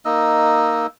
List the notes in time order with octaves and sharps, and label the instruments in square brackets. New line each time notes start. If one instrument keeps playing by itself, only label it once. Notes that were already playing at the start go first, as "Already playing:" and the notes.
[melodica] A#3 D#4 D#5 E6